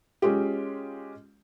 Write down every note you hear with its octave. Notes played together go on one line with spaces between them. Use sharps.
G#3 C#4 F4 G4